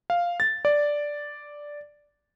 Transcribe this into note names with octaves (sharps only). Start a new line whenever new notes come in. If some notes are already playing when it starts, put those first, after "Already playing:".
F5
A6
D5